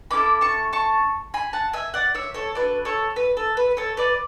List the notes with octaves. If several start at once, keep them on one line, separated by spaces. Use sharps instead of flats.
C#4 E4 A4 B5 D6
A5 C#6
A5 C#6
G#5 B5
F#5 A5
E5 G#5
D5 F#5
C#5 E5
A4 C#5
D4 F#4 A4 B4 D5
A4 C#5
B4
A4
B4
A4 C#5
B4 D5